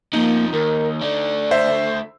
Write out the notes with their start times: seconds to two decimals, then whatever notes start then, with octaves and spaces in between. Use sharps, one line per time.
0.13 C3 F3 A#3 D#4
0.53 D#2 A#4
1.01 D3 A3 D5
1.51 C5 E5